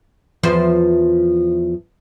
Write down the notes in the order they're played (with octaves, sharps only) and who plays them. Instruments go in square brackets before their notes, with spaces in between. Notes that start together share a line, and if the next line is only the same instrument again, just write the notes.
[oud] E2 F3 C5